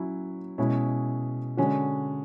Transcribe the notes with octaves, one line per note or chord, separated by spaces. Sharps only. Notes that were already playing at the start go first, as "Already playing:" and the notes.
Already playing: F#3 C#4 E4
B2 G#3 C#4 E4
D3 G#3 C#4 F#4